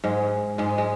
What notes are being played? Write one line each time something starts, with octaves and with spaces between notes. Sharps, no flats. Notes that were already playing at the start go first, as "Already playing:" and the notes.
G#2 G#3
G#2 G#3
G#3